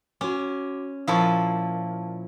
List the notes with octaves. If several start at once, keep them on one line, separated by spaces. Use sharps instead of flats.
C#4 F#4 D6
A#2 F3 E4 F5 A5 C#6